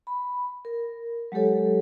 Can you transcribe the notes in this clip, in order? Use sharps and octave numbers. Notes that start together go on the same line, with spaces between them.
B5
A#4
F#3 G#3 G4 A4 C#5